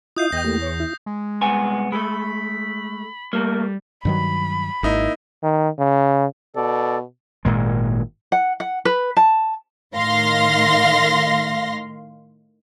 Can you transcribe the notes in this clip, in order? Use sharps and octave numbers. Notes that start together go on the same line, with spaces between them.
E4 F4 D#5 D#6 G6 C7
E2 D#5 G5 A#6
A3 A#3 G4
C#5
E4
G#3
C2 B3 G#5
G#3 A3 B5
G3 A3 A#3
G2 D#3 F#3 B5
G#1 A#3 D#4 E4
D#3
C#3
B2 A4 D5
G#1 A#2 G#3
F#5
F#5
B4
A5
A2 D#3 F5 C6 A#6